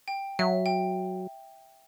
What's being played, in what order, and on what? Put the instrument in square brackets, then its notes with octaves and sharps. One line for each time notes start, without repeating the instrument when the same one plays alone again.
[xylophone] G5
[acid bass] F#3 [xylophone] E5
[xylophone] G5